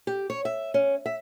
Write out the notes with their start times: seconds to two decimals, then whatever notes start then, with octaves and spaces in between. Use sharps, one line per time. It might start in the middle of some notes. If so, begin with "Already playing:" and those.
0.07 G4
0.30 C#5
0.45 E5
0.74 C#4
1.06 E5